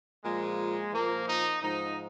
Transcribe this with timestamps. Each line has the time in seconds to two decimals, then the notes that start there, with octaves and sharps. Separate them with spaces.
0.24 A#2 F3 G#3
0.93 A#2 F3 A#3
1.27 D#4
1.62 G#2 F3 D#4